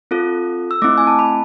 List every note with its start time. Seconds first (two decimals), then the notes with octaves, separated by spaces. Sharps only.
0.11 C4 F4 A4
0.71 E6
0.82 A3 C4 E4 D6
0.98 G#5
1.07 A5
1.19 B5